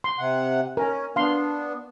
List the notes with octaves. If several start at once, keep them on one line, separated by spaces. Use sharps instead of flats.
C6
C3 F#5
C#4 A#4
B3 D4 F5 C6